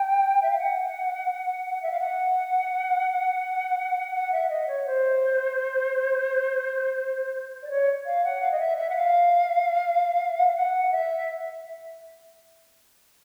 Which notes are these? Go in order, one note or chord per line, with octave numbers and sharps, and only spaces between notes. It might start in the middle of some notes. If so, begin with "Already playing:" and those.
Already playing: G5
E5
F5
F#5
E5
F5
F#5
F#5
E5
D#5
C#5
C5
D5
C#5
F5
F#5
F5
D#5
E5
E5
F#5
F5
F5
F#5
E5